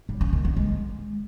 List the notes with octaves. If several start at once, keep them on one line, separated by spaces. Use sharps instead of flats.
G3
C#4
D#3
B3
G#3